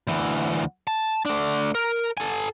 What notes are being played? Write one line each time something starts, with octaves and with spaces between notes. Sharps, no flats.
D2 E3
A5
A3 D4
A#4
A4 G#5